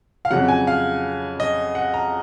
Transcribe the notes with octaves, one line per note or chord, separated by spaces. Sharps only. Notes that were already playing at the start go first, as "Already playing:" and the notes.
F5
F2 C#3 F#3 F#5
G#5
F5
D#5
F#5
A#5